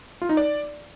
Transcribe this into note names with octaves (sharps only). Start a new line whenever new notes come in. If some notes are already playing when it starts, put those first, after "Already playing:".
F4
D#4
D5